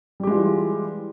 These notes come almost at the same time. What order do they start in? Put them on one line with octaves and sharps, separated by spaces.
G3 G4 G#3 F4 E3